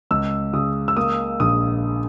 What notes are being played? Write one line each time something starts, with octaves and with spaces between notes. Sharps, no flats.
C#2 E6
C#3 D#6
E6
A#3 D#6
A#1 D#6